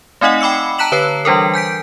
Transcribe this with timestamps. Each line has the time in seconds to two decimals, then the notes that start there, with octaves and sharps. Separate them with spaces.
0.21 A3 C4 D#4 D#5 F#5
0.41 G5 B5 D6 E6 C#7
0.78 A5 A#5 F#6 B6 E7 F#7
0.92 D3 B4 C#5 C7
1.25 E3 G3 D4 A4 A#4
1.54 G#5 G6 B6 D7